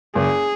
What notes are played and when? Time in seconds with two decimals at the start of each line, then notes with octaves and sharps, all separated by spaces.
0.15 F#1 G#4